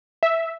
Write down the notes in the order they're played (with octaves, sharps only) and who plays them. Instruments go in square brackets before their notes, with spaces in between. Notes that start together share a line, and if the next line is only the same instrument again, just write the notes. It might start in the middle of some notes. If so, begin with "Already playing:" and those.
[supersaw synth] E5